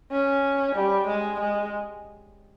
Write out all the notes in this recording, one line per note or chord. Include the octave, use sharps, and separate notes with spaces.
C#4
G3
G#3
G#3